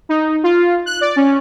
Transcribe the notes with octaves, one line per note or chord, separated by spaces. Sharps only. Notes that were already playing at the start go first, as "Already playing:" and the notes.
D#4
F4
F#6
D5
C#4